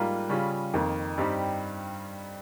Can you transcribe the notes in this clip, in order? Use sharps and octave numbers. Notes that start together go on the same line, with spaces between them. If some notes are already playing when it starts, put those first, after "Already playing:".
Already playing: G#2 G3 A#3 F4
C#3 G3 C#4 F4
F2 D#3 A#3
G2 G3 C4 D#4 G4